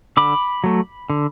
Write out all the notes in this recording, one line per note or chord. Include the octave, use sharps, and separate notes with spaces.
D3 B5 D6
F#3 A3
D3